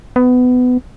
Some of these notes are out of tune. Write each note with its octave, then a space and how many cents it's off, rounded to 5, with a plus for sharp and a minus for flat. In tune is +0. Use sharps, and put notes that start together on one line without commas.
B3 +20